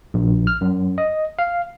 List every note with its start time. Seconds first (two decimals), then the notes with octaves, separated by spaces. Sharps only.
0.14 A#1
0.47 F6
0.61 F#2
0.98 D#5
1.39 F5